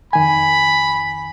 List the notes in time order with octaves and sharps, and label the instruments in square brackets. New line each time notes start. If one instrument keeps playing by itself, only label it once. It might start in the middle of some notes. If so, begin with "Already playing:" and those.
[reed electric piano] F2 D#3 G#5 [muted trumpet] B5